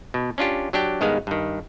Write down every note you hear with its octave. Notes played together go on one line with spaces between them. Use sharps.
B2
C#4 D4 F4 G4
F#3 D4 G4 G5
G2 D#3 G#3 B3 F5
G2 D#3